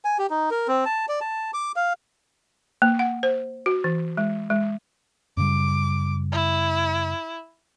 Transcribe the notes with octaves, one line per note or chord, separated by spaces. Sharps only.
G#5
G4
D#4
A#4
C4
A5
D5
A5
D6
F5
A#3
F#5
C5
F#4
E3
G#3
G#3
F#2 C#3 G3 D6
E4